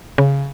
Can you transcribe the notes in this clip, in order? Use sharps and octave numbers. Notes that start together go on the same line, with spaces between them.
C#3